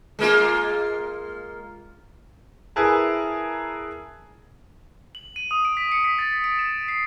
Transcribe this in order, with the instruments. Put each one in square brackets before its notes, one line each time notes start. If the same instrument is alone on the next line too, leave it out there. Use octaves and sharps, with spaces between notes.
[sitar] G#3 A#3 F4
[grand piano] E4 G#4 A#4 B4 A5
[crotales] F#7
D#7
D#6
D7
B6
C#7
B6
A6
D7
E7
C7